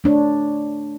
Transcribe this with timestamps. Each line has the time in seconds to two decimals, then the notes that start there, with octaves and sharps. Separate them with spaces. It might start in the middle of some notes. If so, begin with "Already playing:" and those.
0.04 A3 D4 C#5